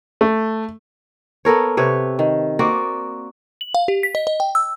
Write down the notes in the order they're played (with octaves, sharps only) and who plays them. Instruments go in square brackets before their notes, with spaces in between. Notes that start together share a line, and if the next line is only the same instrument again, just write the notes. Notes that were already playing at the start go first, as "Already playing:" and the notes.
[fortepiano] A3
[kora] B3 A4 A#4 C#5
C3 B4 C#5
D#3
A#3 C4 F#4 D5
[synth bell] F#7
F5
G4
B6
D#5
D#5
G5
E6